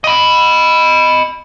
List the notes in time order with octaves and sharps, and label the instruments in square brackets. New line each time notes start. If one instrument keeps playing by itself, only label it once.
[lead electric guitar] D#5 B5